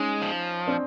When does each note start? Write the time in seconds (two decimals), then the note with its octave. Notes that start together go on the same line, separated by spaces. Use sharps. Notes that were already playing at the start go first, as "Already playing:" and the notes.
Already playing: G#3 C#4 D#4
0.22 F3
0.67 C4 D4